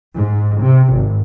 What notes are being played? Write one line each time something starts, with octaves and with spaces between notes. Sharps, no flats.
G#2
C3
G#1